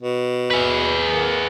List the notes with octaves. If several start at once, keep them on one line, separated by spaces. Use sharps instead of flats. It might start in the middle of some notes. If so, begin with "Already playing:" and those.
B2
G#4 B4
A#3